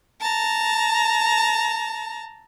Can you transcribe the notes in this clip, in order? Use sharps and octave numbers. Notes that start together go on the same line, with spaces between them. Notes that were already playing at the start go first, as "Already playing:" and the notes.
A5 A#5